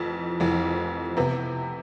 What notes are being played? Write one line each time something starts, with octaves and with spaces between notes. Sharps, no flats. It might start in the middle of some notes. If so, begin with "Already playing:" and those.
Already playing: F1 F2 E3
F1 F2 E3
C3 E3 B3 E4